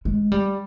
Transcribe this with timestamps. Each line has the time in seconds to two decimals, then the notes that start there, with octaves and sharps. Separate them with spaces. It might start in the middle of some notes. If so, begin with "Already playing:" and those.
0.05 G#3
0.32 G3